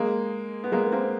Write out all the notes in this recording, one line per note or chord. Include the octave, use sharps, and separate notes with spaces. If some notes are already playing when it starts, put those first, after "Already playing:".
Already playing: G#3 A#3
B3
G#3 A#3
B3
A#3 C4